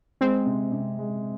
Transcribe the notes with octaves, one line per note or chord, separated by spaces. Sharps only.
G#3 C4
C3
C3
G#3